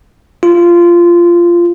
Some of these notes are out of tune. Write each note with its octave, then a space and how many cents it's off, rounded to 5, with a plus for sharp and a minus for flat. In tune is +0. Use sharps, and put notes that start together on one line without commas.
F4 -15